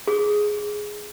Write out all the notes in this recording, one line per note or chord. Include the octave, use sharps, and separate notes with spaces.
G#4